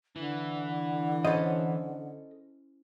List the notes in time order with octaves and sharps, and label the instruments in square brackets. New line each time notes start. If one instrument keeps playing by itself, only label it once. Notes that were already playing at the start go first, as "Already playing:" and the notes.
[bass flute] D3 [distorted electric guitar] E3
[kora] C#4 E4 C5 [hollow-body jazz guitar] A4 D#5